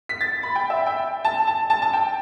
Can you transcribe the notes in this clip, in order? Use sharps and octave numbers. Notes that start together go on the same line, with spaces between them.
B6
A6
B5
G5
E5
G5
A5
A5
A5
A5
G5